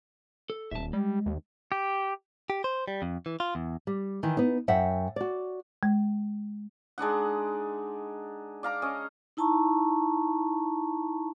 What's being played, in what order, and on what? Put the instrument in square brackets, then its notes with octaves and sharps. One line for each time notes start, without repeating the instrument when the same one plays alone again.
[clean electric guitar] A4
[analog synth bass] D#1 [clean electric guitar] E5 A5
[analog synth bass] G3 [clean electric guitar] G#3
[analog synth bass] D#2
[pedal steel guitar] G4
[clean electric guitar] G4
C5
G3
F2
E3
F4
E2
[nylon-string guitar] G3
D#3 E3
B3 D#4
F#2 E5 F#5 G5
F#4 D5
[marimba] G#3
[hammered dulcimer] G#3 D4 D#4 F#5
D5 F5 A#5 D6
C#4 D#5
[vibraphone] D#4 E4 A5 A#5 C#6